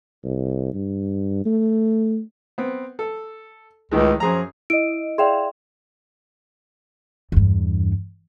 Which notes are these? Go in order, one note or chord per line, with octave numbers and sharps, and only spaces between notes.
C2
G2
A3
B3 C4
A4
C#2 A2 D#3 G#3
F#2 F3 G#4 A#5
E4 D#5 D7
G#4 D5 E5 F5 G5 C6
E2 G2